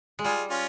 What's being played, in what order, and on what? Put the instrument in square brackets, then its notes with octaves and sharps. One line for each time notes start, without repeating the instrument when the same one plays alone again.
[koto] G#3
[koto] G3 [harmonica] F4 G#4
[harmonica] C#4 F4